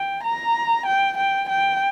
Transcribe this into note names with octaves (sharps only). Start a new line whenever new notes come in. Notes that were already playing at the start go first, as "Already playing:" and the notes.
Already playing: G5
A#5
G5
G5
G5